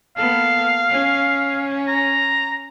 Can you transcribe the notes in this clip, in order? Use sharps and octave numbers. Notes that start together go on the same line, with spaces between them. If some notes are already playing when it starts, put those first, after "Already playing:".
A#3 B3 A4 F5
C#4
A#5